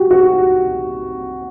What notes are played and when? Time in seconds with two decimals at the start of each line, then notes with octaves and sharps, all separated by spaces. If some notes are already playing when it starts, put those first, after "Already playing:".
Already playing: F#4 G4
0.11 F#4